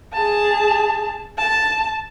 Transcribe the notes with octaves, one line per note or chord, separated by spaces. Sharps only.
G#4 A5
A5